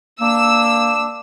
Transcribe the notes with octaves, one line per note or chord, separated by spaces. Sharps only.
A#3 D4 E6